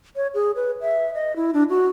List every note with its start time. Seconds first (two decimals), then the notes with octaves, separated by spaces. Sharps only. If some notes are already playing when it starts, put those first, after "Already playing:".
0.16 C#5
0.34 G#4
0.56 B4
0.81 E5
1.14 D#5
1.36 E4
1.54 D4
1.69 F#4